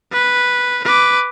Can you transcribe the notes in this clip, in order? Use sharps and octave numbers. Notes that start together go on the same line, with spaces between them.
B4
B4 D6